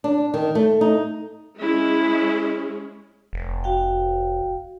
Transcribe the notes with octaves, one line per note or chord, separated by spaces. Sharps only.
D4
D#3
A3
D#4
G#3 C#4 E4 G#4
F1
F#4 F5 G5